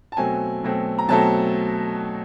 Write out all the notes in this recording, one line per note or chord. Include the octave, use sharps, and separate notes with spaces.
A5
B2 F#3 A3 C4 G#5
B2 F#3 A3 C4
A#5
B2 F#3 A3 C4 A5